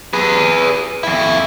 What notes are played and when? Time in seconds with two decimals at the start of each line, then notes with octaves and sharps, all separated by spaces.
0.13 G#4 B4
1.03 F2 E4